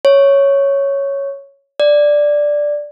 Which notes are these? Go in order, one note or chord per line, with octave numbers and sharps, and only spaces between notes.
C#5
D5